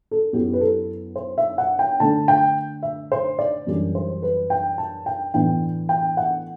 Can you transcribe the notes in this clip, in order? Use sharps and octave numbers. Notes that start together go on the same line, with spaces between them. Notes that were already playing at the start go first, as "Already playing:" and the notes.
A4
F#2 F#3 B3 E4 G4
B4
A4
C5
E5
F#5
G5
D3 A3 D4 A5
G5
E5
C5
D5
F#2 E3 G3 D4
C5
B4
G5
A5
G5
A2 E3 B3 D4 G5
G5
F#5